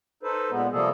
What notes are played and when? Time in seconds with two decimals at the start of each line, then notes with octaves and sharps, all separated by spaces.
0.23 D#4 A4 B4 C5
0.50 A#2 G#3 B3
0.72 C3 F3 G3 A#3 G#4 A4